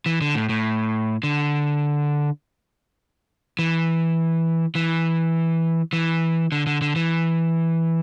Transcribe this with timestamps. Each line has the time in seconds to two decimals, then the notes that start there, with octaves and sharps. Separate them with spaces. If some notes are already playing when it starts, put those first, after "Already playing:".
0.06 E3
0.21 D3
0.35 A2
0.49 A2
1.23 D3
3.59 E3
4.75 E3
5.93 E3
6.52 D3
6.67 D3
6.81 D3
6.96 E3